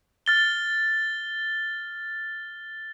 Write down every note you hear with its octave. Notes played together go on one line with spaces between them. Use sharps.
F6 A6 G7